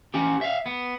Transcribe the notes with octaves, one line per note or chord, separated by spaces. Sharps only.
C#4 G4
E5 F5
B3